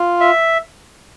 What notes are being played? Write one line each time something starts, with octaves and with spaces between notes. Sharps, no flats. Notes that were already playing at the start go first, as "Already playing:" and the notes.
Already playing: F4
E5